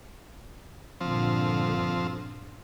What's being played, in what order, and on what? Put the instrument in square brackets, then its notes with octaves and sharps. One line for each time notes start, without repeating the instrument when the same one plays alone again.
[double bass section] G2 A#2 D3 [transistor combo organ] F3 C4